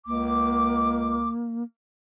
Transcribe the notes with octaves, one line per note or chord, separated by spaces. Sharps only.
C#2 A#3 D6